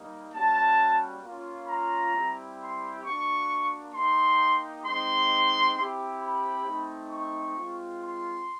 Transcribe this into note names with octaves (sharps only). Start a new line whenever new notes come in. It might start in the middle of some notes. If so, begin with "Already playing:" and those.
Already playing: G3 A#3 D#4
G3 A#3 C#4 F#4 A5
A#3 C#4 F4
A#5
G3 C4 E4 G4
C6
A#3 D4 F#4 C#6
A#3 D#4 G4 C6
G#3 C4 D#4 C6
C4 E4 G4
B5
A3 C4 D#4
C#6
G#3 C4 F4
C6